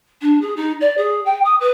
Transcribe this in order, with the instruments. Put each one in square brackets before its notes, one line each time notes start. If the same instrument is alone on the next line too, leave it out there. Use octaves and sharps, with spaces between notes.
[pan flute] D4
G#4
D#4
D5
G#4
G5
D#6
B4